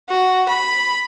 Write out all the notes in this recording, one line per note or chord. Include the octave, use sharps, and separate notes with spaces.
F#4
B5